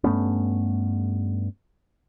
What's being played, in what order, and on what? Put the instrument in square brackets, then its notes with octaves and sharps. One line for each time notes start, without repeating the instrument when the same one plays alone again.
[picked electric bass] G2 A3 B3 C#4